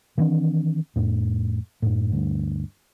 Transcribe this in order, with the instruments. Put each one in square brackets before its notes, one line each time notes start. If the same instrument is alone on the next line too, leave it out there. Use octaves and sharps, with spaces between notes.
[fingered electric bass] D#3 E3 C4 D4
F2 A2
F#2 A2
D2 G2